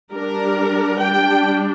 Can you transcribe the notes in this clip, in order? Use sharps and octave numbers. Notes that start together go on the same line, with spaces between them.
G3 D4 A#4
G3 D4 G5